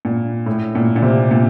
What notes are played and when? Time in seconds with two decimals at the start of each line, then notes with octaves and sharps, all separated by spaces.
0.05 A#2
0.46 A2
0.75 A#2
0.96 A#2
1.02 C3
1.31 A#2